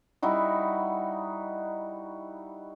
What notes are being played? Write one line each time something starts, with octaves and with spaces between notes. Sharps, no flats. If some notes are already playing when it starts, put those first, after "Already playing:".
G3 D#4 E4 F#4